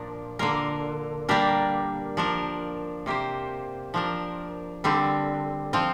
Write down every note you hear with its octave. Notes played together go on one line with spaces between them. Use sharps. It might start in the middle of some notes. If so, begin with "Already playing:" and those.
Already playing: A#2 F3 D4 A#4
D3 A#3 F4 A#4
G3 A#3 D4 G4 A#4
F3 D4 A#4
C3 A#3 G4 C5
F3 D4 A#4
D3 G3 C4
F3 C4 F4